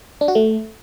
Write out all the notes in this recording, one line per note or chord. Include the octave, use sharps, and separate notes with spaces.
D4
F#4
A3